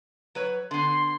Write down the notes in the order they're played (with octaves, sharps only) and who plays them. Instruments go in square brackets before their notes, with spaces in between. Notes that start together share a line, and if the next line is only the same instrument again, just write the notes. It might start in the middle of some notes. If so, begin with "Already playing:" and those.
[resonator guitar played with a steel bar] F#3 B4 C#5
[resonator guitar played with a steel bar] D3 B3 [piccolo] C6